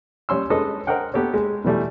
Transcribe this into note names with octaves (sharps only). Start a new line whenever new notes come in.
G3 C#4 C6 E6
G#3 C#4 A4 B4 D#5
A#4 C5 D#5 F#5 G5
B3 G4 A4 C#5
G#3
B2 E3 G3 A3